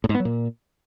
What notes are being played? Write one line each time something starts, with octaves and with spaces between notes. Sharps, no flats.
A2
G#2
B3
F#3
A#2